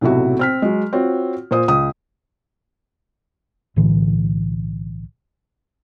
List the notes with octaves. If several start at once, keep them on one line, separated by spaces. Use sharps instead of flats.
B1 A2 C3 E4 F#4
C4 F6 B6
F#3 G#3
C4 F4 F#4 C#5
A#2 F4 C5 D#6
C#2 D#6
B1 A2 D3 E3